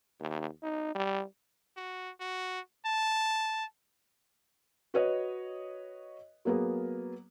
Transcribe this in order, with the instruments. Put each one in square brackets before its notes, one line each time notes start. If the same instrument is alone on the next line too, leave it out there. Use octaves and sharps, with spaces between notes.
[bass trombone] D#2
D#4
G3
[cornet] F#4
F#4
A5
[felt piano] F#4 B4 C#5 D#5
F#3 A#3 B3 G#4 A#4